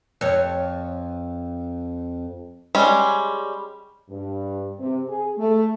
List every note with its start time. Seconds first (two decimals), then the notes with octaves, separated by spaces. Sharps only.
0.21 F2 C#5
2.75 G3 G#3 C#4
4.10 G2
4.79 C3
5.09 G#4
5.38 A3